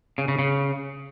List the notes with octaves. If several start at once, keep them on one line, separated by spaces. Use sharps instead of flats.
C#3
C#3
C#3